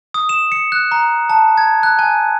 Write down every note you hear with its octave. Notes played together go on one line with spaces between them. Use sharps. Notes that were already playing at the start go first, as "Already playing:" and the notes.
D#6
E7
C#7
F#6
A#5
A5
G#6
F#6
G#5